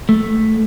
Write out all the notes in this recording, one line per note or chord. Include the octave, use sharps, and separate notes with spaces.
A3